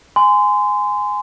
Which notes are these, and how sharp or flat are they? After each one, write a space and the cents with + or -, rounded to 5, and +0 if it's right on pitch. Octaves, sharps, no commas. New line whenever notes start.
G#5 +0 C6 -30